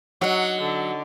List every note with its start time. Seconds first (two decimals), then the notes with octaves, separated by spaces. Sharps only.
0.21 F#3 D4 D#4 F#5
0.62 D3